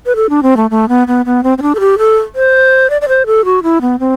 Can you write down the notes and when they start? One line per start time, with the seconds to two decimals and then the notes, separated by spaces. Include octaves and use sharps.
0.06 B4
0.16 A4
0.30 D4
0.43 C4
0.57 A3
0.71 A3
0.89 B3
1.08 B3
1.26 B3
1.44 C4
1.58 C4
1.62 D4
1.75 A4
1.80 G4
1.98 A4
2.35 C5
2.90 D5
3.01 D5
3.08 C5
3.26 A4
3.45 F#4
3.63 E4
3.81 B3
4.00 C4